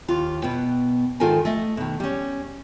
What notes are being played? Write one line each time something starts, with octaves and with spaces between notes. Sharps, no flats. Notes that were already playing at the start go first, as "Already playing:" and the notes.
D#2 F4
B2 B3 G5
G#2 D#3 F4 A4 A#4 G#5
A3 D#5
B2 D#3
G3 C#4